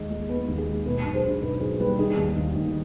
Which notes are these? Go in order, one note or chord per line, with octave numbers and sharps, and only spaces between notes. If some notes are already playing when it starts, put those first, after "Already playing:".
Already playing: D#2 G#3
G#3
B3 B4
D#2
G#4
G#3
B2 B4
B1
G#4 C5
D4
B1 B4
B1 G#4
G3 B4
D#3 G#4
D#2
D#2
D#2